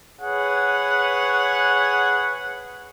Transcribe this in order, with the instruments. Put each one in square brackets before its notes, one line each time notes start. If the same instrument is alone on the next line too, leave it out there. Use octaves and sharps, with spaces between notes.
[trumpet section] G#4 B4 C#5 F#5